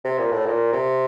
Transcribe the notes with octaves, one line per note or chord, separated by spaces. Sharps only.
C3
A#2
A2
A#2
C3